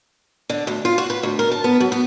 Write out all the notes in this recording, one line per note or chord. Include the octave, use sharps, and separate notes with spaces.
D3
D2
F4
F#4
B4
D2
A#4
A5
B3
F#3
B3